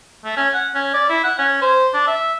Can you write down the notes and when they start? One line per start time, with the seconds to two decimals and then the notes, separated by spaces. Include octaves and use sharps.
0.24 A3
0.37 C#4
0.54 F#5
0.74 C#4
0.94 D5
1.09 E4
1.24 F#5
1.38 C#4
1.62 C5
1.94 D4
2.07 E5